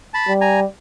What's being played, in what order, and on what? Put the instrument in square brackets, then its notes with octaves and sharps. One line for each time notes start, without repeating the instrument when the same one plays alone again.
[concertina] A5 B5
[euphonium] G3
[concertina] G#5 A#5